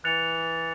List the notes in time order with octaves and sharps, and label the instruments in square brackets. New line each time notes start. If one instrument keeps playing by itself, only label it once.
[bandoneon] E3 [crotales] F#6 A6 C#7 F7